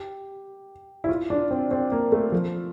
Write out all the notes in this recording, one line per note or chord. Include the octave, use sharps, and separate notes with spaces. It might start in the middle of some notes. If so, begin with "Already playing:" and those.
Already playing: G4
E4
F4
D4
C4
C4
A#3
A3
F3